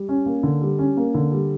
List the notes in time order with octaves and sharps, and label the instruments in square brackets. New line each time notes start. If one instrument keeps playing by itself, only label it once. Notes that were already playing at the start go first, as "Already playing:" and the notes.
Already playing: [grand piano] G3
C#4
A#3
D3
G3
C#4
A#3
D3
G3